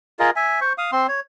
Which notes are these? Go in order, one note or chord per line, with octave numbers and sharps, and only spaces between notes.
F4 G#4 A#4 D#5
E5 G#5
C5 C#6
F5 D#6
C4 C6
C#5